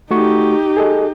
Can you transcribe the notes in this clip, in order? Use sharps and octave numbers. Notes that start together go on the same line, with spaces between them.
A3 D#4 F#4 G4 C#6
G#4 A4 D#5